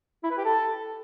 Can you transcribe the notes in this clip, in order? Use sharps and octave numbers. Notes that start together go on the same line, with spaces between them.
E4
B4
G4
A4